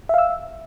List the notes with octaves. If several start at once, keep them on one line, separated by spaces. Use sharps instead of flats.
E5 F5 E6